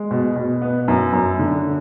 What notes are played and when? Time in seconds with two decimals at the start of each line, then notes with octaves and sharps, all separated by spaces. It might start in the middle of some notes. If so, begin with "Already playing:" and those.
Already playing: G#3
0.11 B2
0.36 B2
0.62 B3
0.88 F#2
1.13 F#2
1.39 D3